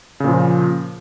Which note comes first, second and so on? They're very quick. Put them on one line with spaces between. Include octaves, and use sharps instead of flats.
C#3 A#2 F3